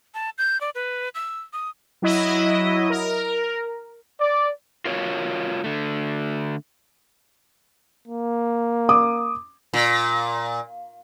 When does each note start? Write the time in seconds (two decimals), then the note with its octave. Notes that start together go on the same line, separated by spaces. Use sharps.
0.14 A5
0.38 G6
0.61 D5
0.75 B4
1.15 E6
1.53 D#6
2.02 F#3 E4 D#5
2.90 A#4
4.20 D5
4.85 F4 F#4 A#4 C#5 F5
5.64 D3 A3
8.08 A#3
8.89 D6 D#6
9.74 A#2